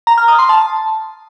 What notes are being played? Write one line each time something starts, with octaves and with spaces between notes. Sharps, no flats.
A#5
F6
D#6
C6
A5